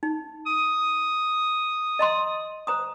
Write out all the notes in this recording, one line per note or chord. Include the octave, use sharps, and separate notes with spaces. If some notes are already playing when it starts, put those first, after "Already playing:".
D#4
D#6
D#5 A#5 C6
C5 A#5 D#6